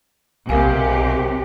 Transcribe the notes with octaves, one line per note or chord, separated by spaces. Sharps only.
B1 C3 G4 A#4 F5 G#5